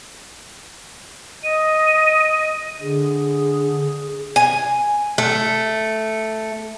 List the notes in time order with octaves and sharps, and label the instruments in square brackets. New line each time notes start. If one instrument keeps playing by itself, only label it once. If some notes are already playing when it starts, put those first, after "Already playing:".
[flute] D#5 [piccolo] D#7
[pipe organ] D3 [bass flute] G#4
[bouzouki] G#5
A3